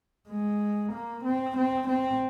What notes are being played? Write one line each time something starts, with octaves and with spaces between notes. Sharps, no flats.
G#3
A#3
C4
C4
C4